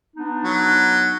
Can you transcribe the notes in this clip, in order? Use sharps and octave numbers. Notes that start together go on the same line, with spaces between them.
B3 D4 D#4
F#3